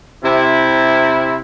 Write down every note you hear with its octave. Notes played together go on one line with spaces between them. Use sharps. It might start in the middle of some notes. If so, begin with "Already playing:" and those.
C3 E4